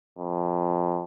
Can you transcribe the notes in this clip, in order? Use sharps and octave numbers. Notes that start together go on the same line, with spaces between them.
F2